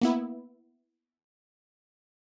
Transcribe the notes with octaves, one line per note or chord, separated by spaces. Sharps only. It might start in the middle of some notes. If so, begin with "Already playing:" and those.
A#3 B3 E4